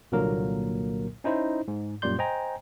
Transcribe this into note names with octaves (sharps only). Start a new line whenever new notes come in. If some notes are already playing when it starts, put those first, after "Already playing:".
C2 A#2 D3 F#3 A#3 A#4
C#4 D#4 E4 C5
G#2
F#2 A#2 G3 D5 C6 G6
C5 D#5 G5 G#5 A#5